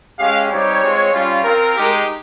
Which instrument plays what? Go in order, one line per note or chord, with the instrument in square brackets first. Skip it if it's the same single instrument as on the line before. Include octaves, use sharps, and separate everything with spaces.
[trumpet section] G#3 C#4 G4 F5
G3 C4 D#4 G4 C#5
G#3 C4 F4
G3 C#4 F4
C4 F4 A#4
G#3 D#4 G4